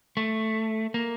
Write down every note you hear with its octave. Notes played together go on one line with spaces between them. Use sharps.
A3
A#3